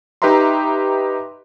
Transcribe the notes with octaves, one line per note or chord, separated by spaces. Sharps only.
D#4 G4 B4 E5 A#5 C6